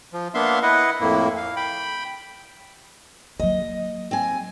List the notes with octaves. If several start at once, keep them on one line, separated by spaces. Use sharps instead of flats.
F3
A#3 B3 D4 E5 F5 C6
E4 B4 D#5 F#5
F2 A2 A#3 E4
F5
G5 B5
F#3 A#3 D#5
C4 G#5